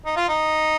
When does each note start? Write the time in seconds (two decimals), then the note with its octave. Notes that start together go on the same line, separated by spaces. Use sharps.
0.06 D#4
0.17 F4
0.29 D#4